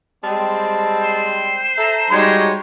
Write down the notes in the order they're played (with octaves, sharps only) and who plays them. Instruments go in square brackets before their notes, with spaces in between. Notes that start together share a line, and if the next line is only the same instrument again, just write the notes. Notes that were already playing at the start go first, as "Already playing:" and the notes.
[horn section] G3 G#3 C4 [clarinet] A5
[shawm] C5
[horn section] A4 A#5 [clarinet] E5
[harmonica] G3 D#4 G4 [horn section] G#3 F#4 C#5 [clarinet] C6